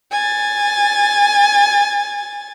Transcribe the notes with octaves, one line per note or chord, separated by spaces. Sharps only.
G#5 A6